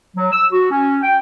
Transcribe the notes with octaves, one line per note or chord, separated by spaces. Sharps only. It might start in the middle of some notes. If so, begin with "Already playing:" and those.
F#3
E6
F#4
C#4
G5